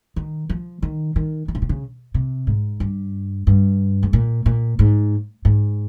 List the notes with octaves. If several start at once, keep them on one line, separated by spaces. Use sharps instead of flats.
D#3
F3
D#3
D#3
D#3
C#3
C3
C#3
C3
G#2
G2
G2
G#2
A#2
A#2
G#2
G#2